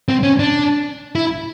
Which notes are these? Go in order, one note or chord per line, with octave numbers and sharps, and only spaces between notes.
C4
C#4
D4
E4